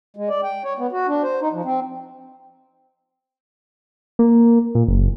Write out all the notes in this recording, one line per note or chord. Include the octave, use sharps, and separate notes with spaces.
G#3
D5
G5
C#5
B3
F#4
D4
C5
D#4
F3
C4
A#3
A#2
F#1